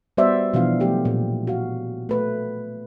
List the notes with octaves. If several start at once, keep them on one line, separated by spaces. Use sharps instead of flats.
G3 B3 F#4 C5 D5 E5
B2 E3 F3 B3 D4 F5
F#3 A3 G4
A#2
F#4 F5
A3 B4